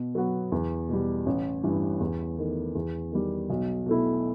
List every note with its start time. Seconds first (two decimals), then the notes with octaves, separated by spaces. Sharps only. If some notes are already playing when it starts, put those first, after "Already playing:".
Already playing: B2
0.15 F#3 B3 F#4
0.52 E2
0.89 B2 G3
1.26 A1
1.63 G2 E3
2.00 E2
2.38 D#3 A3
2.75 E2
3.12 D#3 G3
3.50 B1
3.86 B2 A3 E4